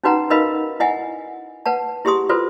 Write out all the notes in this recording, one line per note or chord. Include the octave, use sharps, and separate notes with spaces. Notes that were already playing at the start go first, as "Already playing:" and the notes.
C#4 D#4 F#4 B4 F#5 A#5
D#4 A#4 B4 D#5 F5 B5
E4 D#5 F#5 G#5
B4 F#5 A5
E4 G4 G#4 C6 D#6
F4 F#4 A4 B4 C5